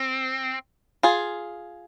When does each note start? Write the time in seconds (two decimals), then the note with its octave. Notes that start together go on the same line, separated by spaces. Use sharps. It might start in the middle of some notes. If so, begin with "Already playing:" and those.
Already playing: C4
1.03 F4 G#4